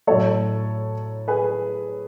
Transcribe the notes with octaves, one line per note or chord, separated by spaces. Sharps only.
A2 F#3 A3 A4 C#5
G#4 B4